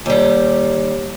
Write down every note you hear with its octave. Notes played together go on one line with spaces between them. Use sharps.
D#2 G3